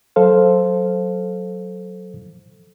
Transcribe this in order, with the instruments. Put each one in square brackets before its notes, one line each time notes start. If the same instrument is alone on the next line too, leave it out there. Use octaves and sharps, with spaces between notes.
[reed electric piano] F#3 A4 C5 F5